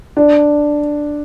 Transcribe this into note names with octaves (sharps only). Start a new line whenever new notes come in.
D4